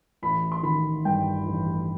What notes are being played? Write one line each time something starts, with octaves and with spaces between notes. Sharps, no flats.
A1 B5
C6
D#3 B5
G2 G5
A1